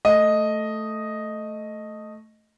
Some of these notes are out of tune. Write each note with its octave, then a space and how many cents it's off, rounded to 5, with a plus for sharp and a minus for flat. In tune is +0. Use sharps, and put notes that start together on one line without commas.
A3 +0 D#5 +0